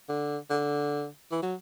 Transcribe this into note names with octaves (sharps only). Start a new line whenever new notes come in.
D3
D3
E3
F#3